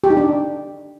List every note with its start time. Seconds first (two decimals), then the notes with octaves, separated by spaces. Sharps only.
0.04 G4
0.10 D#4
0.17 D4